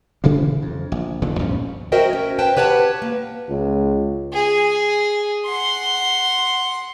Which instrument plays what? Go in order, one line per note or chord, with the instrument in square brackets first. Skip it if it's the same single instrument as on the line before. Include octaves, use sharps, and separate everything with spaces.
[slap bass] C#3 E3 G3 A#3
F2
A#1
F1 A#2 D3 D#3
D2 G2 F3 C#4
[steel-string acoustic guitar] F#4 A#4 C5 D#5 E5 G5
C#4
B4 C5 G5 A5
G4 B4 C#5 F#5 A5
A#3
[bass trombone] C#2
[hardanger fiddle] G#4
F#5 C6